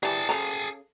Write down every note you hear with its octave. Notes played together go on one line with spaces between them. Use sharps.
E3 G3 G#4 A5
C#3 A4 A#5